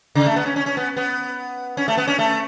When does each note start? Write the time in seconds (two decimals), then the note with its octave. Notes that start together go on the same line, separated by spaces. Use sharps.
0.15 C#3
0.26 A3
0.36 B3
0.46 C#4
0.56 C#4
0.66 C#4
0.77 B3
0.97 B3
1.77 C#4
1.88 A3
1.97 B3
2.08 C#4
2.19 A3